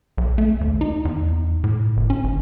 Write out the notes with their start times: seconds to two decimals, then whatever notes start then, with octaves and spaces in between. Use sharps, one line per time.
0.17 B1
0.38 A3
0.61 D#2
0.81 D#4
1.05 E2
1.64 A2
1.97 G1
2.10 C#4
2.24 G#1